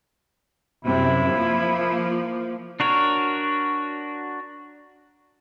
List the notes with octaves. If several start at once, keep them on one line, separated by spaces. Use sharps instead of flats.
F#2 C3 E4
F3 A#3
D4 F#4 A#4 C#5